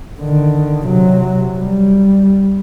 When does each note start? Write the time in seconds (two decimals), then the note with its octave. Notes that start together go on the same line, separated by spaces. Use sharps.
0.19 D3 D#3
0.86 C3 F#3
1.60 G3